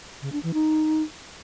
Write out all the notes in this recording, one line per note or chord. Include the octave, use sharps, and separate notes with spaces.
C#3
D4
E3
D#4